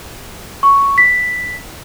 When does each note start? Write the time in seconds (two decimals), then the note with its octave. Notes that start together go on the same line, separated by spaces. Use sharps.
0.63 C#6
0.98 B6